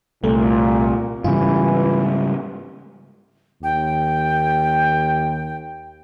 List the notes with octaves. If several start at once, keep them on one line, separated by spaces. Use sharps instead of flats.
C2 A#2 A3
G#2 C#3 E3 G3 F4
D#2 G5